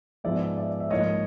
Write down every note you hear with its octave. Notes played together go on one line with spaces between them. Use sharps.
G#2 F3 G#3 B3 D5 E5
D5 E5
E5
G#2 F3 A#3 C#5 D#5